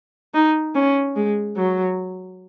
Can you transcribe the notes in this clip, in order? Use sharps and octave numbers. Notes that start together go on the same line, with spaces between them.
D#4
C#4
G#3
F#3